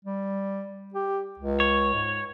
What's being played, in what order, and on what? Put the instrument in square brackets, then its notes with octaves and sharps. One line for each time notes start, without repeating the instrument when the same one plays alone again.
[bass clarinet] G3
G4
C#2
[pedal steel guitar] C#5
[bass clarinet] G#2